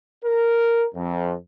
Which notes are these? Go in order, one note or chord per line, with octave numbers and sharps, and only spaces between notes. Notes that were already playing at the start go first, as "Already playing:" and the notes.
A#4
F2